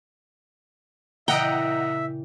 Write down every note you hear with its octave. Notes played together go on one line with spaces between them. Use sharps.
A#2 C#3 E3 D#5 E5 F#5 G5 A#5